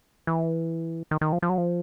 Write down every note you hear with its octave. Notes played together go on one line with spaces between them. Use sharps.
E3
D#3
D#3
F3
F3
F#3
F3